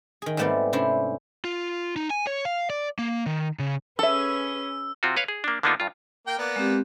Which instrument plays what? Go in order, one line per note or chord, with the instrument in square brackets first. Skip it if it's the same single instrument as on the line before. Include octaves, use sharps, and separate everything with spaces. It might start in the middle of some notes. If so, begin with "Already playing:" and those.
[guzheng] D#3 G#4
G#2 G3 A3 B3 C4 D5
C3 C#4 D4 E4 C5
[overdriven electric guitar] F4
D#4
G#5
C#5
F5
D5
A#3
D#3
C#3
[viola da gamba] C#4 G#4 B4 [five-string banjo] A4 E5 [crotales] E6
[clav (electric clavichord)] C3 C4 F4 F#4
B4 C#5 F5
G#4
A#3 D4
D3 A#3 B3 D4 D#4 F4
G2 F4
[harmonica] A#3 G5
A#3 B3 D5
[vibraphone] G#3 C4 G4